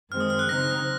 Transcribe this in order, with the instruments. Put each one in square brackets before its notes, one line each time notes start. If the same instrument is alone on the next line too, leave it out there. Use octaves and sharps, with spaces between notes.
[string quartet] F#2 D#3 G#3 C4 [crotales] F6
[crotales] D#6
F6
F#6
[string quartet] C#3 F#3 C4 D#4 [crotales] A#6